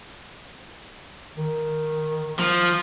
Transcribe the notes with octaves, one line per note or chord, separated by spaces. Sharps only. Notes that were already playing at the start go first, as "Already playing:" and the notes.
D#3
F3